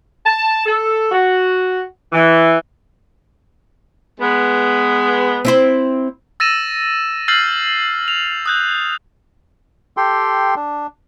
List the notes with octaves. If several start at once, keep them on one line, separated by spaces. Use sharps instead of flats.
A5
A4
F#4
E3
G#3 B3
C4 E4 C5
E6 A6 A#6 D#7 E7
E6 F6 G6 A6 C7 F#7
F7
D#6 F#6 G6
G4 A4 G5 C6
D4